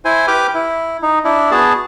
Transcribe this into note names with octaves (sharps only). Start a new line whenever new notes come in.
E4 C5 G#5
G4 B4 G5 D6 F6
E4
D#4
D4 E4
B3 F#4 G#4 A5